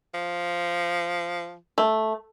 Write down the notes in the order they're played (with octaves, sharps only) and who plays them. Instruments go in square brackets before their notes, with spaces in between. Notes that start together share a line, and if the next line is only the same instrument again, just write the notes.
[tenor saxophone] F3
[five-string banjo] A3